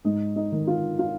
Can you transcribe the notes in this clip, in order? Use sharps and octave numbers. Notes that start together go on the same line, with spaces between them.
G#2 D#4 D#5
D#4 D#5
D#3
F4 F5
F4 F5